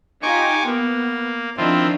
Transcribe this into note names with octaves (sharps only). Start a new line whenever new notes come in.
D#4 F4 G4 G#5 C#6 D6
A#3 B3
D#3 F3 C4 D4 E4 F4